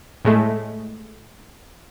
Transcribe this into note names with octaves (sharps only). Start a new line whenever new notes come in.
A2 G#3 A3